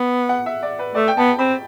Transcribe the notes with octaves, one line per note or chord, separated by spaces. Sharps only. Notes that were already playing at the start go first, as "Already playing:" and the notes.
Already playing: B3
F#5
E5
D5
B4
A3 D5
G5
B3 A5
C4 B5